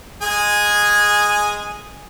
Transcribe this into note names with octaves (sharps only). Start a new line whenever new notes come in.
G#3 G#4 G#5